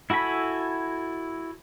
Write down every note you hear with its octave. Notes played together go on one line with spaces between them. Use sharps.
E4 F#4 A4 G#5 B5